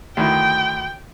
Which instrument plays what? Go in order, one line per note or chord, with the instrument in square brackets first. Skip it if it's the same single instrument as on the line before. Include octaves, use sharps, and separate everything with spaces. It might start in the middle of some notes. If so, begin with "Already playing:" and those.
[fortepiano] D2 D#3 E4 [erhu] G5